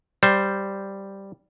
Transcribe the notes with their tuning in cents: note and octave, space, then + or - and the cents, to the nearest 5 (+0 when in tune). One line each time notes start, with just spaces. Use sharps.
G3 +0 C5 +0